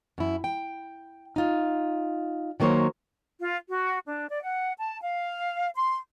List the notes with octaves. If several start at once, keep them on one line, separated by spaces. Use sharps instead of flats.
F#2 E4
G5
D#4 F4
D#3 F#3 A#3 C5 C#5
F4
F#4
D4
D5
F#5
A5
F5
C6